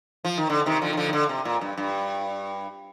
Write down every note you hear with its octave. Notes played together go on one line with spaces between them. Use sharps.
F3
D#3
D3
C3 D#3
D3 F3
D#3
D3 F3
D#3
D3
C3
A#2
G2
G2